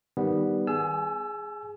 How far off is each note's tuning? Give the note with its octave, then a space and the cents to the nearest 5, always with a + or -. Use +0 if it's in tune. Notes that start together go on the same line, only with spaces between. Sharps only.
D#3 +0 G3 +0 B3 +0
G#4 +0 G#5 +45 E6 +25